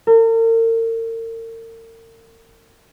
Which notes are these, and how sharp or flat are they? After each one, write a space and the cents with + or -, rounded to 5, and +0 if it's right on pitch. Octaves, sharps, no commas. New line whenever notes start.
A#4 -40